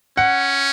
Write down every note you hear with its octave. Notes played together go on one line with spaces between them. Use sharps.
C#4 F#5